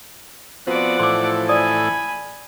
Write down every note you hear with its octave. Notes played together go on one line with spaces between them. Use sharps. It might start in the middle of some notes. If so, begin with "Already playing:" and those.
F3 B3 C4 F#4 D5 F#5
A2 E3 A4 C6 D6
D5 G#5 B5 D#6